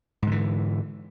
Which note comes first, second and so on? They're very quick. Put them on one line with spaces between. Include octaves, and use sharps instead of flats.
G#2 D3 E3